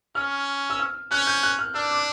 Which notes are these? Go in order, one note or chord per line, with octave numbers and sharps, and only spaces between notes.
C#4 F6
E6
F6
C#4 F#6
G6
F#6
F6
D4 E6
D6